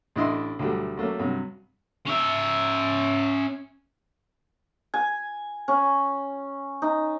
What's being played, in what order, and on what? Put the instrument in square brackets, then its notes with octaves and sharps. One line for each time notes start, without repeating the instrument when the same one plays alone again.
[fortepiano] A1 D4 E4 D#5 E5 C6
D2 B2 F#3 G3 A3
F#3 A3 A#3 C#4
G2 C3 F#3
[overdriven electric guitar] C#4 E5
[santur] G#5
C#4
D#4